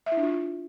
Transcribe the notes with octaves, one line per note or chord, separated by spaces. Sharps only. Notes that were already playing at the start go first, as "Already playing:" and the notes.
E5
E4
D4
F4